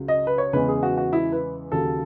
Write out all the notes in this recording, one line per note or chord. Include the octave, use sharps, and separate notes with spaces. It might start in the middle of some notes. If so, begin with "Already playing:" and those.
Already playing: C#2 C#3 F#3
D#5
B4
C#5
E2 C#3 E3 G#3 B4
G#4
F#4
F#4
E4
B4
D#2 C#3 F#3 A4